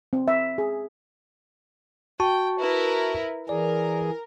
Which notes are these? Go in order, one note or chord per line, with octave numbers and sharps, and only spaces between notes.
C4
E5
G#4
F#4 G5 A5 C#6
E4 A#4 B4
E3 G#4 A#4 D5